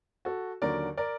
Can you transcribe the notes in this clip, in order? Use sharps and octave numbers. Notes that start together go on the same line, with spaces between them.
F#4 A4
D#2 D3 F#3 A#4 D5
A#4 D5